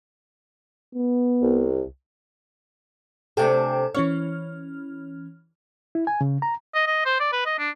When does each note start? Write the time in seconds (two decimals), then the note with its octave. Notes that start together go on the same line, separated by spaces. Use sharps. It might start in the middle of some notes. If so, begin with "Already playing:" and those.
0.95 B3
1.41 C2
3.37 C3 A3 D4 A4 G5 G#5
3.95 E3 C#4 C#5 F6
5.95 E4
6.07 G#5
6.21 C#3
6.42 A#5
6.75 D#5
6.87 D#5
7.05 C5
7.20 D5
7.32 B4
7.46 D#5
7.58 D4